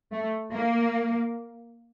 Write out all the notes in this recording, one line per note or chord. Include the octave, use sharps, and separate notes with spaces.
A3
A#3